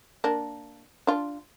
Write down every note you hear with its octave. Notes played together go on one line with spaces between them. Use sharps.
A#3 D4
D4 F4